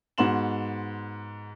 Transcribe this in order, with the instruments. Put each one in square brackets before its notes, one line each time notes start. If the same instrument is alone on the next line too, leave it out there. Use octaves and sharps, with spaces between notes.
[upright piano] G#2 B3 F#4 C6 E7 F#7